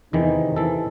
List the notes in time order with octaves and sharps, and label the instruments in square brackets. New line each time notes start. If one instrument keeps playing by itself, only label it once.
[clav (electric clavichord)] E2 D#3 E3 [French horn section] C3 D#4
[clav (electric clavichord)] E3 A4